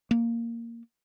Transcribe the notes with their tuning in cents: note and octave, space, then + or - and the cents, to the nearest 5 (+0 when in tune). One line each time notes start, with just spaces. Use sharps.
A#3 -5